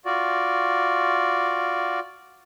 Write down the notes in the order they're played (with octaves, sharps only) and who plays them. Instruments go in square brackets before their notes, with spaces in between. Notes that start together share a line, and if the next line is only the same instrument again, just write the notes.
[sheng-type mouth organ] F4 F#4 D5